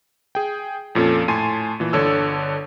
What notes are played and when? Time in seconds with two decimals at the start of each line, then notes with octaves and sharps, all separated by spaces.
0.35 G#4 G5
0.95 F2 A#2 C#4 A4 A5
1.28 A2 G#5 A5 C6 D#7
1.80 A#2 E3
1.93 G1 D3 C#5 A5 E6